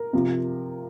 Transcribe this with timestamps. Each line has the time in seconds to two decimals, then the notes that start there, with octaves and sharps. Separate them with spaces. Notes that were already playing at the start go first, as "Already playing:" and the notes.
Already playing: A#4
0.13 C3 F3